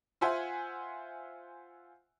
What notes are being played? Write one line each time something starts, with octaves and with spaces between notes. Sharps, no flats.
F4 C5 E5 F#5 G#5